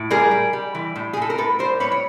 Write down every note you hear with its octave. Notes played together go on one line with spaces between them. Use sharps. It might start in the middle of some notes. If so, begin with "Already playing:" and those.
Already playing: A2
G3 G#4 A#4
G3
G3
E3
A2
G#4
A2 A4
A#4
A2 A4 B4
G3 A#4 C5
A2 B4 C#5
C#5